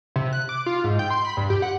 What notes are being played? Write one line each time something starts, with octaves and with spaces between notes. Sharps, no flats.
C3
F#6
D6
F4
G#2
G5
C6
B5
G2
G4
F#5